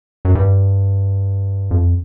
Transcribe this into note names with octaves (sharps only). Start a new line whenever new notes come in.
F#2
G2
F2